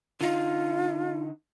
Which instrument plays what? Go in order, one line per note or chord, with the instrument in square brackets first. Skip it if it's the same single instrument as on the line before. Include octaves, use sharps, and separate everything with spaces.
[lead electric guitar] D3 D#4 [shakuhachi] F4